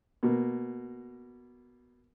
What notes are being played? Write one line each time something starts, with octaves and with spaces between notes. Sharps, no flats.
B2 A#3